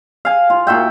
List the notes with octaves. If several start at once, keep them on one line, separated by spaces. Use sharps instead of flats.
F5 G#5
F4
A#2 F#4 E5 G5